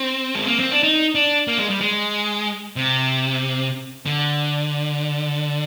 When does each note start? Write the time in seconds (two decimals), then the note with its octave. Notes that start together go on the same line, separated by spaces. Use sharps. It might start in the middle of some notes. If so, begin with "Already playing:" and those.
Already playing: C4
0.35 G#3
0.47 A#3
0.59 C4
0.71 D4
0.83 D#4
1.15 D4
1.47 A#3
1.58 G#3
1.70 G3
1.81 G#3
2.76 C3
4.06 D3